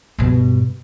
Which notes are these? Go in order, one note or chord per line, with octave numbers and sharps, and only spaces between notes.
G2 B2